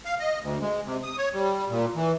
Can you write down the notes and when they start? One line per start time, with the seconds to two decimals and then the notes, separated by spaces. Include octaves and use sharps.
0.05 F5
0.20 D#5
0.43 D2
0.61 G#3
0.86 C3
1.03 D#6
1.17 C#5
1.34 G3
1.69 A#2
1.96 E3